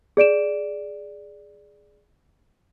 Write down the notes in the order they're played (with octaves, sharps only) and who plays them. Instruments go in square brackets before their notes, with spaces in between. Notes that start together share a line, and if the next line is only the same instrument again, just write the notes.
[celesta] G#4 D5 D7 E7